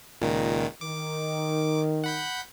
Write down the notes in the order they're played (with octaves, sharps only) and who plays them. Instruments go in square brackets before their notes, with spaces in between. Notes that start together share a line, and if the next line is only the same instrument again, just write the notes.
[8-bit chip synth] C#2 A#2 D#3
[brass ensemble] D#3 [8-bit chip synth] D6
[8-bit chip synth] F#5 B5 G6